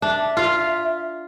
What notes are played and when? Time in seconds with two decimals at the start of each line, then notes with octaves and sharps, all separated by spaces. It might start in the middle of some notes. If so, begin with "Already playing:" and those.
0.02 D4 E5
0.37 F4 F5